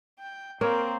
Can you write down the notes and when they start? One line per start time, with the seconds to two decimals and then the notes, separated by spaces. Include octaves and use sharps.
0.19 G5
0.61 A#3 C4 A#4 C#5